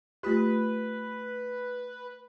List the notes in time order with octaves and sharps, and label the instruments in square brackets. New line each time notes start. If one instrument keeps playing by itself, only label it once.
[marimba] A3 F4 G4 [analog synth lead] B4